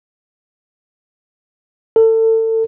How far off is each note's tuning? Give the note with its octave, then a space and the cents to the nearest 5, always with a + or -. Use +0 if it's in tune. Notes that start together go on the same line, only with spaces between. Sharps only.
A4 +30